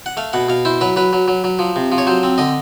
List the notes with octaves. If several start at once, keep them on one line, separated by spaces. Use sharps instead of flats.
F#5
A3 F5
B2 F#5
B2 F5
E4 C5
F#3 B4
F#3 B4
F#3
F#3
F#3
F3
C3
F3
C#5
F#3 C5
C4
D3 D#5